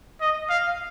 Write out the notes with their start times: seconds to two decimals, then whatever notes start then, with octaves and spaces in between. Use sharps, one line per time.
0.21 D#5
0.50 F5